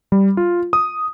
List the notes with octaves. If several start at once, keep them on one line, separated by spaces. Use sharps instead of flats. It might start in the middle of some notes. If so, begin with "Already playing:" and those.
G3
F4
D#6